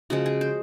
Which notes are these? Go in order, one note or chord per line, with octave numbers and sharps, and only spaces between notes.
C#3 F3 G#3 F#4
G#4
C5